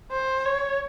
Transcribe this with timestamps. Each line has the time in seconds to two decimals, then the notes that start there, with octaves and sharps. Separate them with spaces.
0.12 C5
0.45 C#5